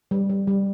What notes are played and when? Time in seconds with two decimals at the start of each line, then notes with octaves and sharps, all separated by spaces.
0.11 G3
0.29 G3
0.47 G3